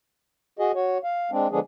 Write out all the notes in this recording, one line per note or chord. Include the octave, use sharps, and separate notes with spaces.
F#4 G#4 D#5
F#4 C#5
F5
G#3 C4 D4
D3 F3 G#3 B3 D4 G#4